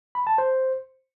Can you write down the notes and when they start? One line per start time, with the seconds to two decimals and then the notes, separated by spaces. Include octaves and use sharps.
0.15 B5
0.27 A5
0.38 C5